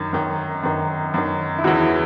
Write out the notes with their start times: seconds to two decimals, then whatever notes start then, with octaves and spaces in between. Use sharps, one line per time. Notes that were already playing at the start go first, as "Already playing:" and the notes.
Already playing: F#2 D#3
0.13 F#2 D#3
0.63 F#2 D#3
1.14 F#2 D#3
1.58 E4
1.64 E2 C#3 E3 F#4